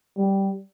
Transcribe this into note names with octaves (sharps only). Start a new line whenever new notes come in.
G3